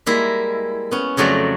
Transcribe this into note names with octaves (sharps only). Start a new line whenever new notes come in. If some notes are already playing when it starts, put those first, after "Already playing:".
G3 G#3 A#3 E4
B3 C#4
F2 C#3 F#3 A3 D5 A#5